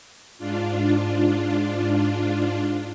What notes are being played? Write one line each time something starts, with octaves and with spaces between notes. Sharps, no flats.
G#2 D4 F4